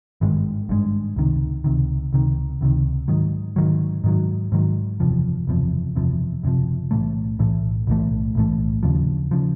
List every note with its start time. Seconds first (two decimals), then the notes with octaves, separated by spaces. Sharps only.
0.21 G#1 G2 D#3 G#3
0.69 G#1 G2 D#3 G#3
1.16 C#2 C3 D#3
1.64 C#2 C3 D#3
2.13 C#2 C3 D#3
2.61 C#2 C3 D#3
3.08 G#2 D#3 F#3
3.56 G#2 D#3 F#3
4.04 G#2 D#3 F#3
4.52 G#2 D#3 F#3
5.00 F#1 E2 C3 F3
5.47 F#1 E2 C3 F3
5.95 F#1 E2 C3 F3
6.43 F#1 E2 C3 F3
6.91 B1 A2 E3 A3
7.39 B1 A2 E3 A3
7.87 B1 A2 E3 A3
8.35 B1 A2 E3 A3
8.83 D#2 C#3 F3
9.31 C#3 F3